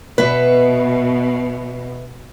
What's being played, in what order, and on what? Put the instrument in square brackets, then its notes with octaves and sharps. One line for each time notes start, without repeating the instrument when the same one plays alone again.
[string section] B2 [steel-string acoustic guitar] B4 E5